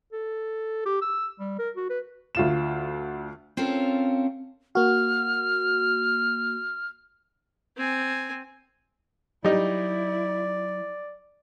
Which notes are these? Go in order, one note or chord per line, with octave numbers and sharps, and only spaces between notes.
A4
G4
E6
G3
A#4
F#4
B4
D2 F4 E7
C4 C#4 F4 A4 A#4
A#3 F#4 F6
C4 G#5
F#3 G3 D#4 E4 D5